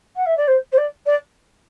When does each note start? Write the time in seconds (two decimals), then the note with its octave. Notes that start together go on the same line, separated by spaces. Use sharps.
0.16 F#5
0.25 E5
0.37 D5
0.47 C5
0.72 C5
0.77 D5
1.06 D5